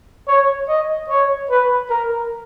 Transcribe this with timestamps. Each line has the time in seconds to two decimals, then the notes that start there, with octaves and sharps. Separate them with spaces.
0.28 C#5
0.68 D#5
1.09 C#5
1.50 B4
1.90 A#4